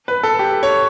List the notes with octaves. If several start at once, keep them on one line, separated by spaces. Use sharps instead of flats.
B4
A4
G4
C#5